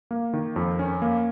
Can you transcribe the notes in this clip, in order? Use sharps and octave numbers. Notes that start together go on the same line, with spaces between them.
A#3
D#3
F2
C#4
A#3